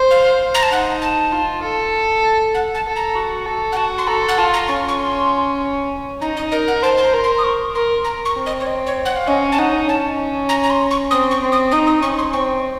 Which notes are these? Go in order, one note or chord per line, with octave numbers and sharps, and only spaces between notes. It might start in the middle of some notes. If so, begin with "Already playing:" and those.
Already playing: C5
F5
A#5
A5
D#4 F#5
A5
F4
A4
F#5
A5
A4
A#5
F#4
A4
F#5
F#4 A5
C6
A4 A#5
F#5
F4 A5
A#5
C#4 C#6
C#6
C6
D#4 A#5
D#5
A#4 D#5
F#5
C5 A5
A5
A#5
A#4
C6
D#6
C#6
A#4 C6
A#4 A#5
C#6
C4
D#5
C#5
D#5
C#5
F#5
F5
C#4 D#5
A5
D#4 F#5
C#4 A5
A#5
A#5
C6
C#6
C4 D#6
C#6
C4
D#6
D#4 D#6
D#6
C#4 C#6
C6
C4 C#6